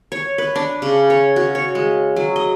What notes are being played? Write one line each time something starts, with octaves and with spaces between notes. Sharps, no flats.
C#5
B4
D4
C#3
C#5
F#4
C#5
G#3
F#3
D#5